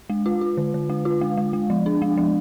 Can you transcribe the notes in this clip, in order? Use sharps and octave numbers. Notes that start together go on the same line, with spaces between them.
G#3
F4
F4
D3
D3
G#3
F4
G#3
G#3
G#3
F3
D4
G#3
F3